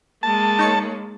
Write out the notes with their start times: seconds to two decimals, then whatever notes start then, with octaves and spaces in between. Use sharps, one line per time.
0.23 G#3 A#3 A5
0.59 D#4 C#5 C#7